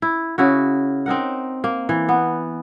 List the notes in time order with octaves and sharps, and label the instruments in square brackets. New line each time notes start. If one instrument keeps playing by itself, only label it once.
[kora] E4
C#3 E4 F#4
C4 D#4 A#4 F#5
A#3
E3
B3